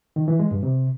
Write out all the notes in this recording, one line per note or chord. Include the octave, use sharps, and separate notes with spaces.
D#3
E3
G#3
G2
C3